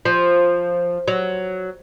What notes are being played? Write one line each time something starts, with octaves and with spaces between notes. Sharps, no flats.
F3
F#3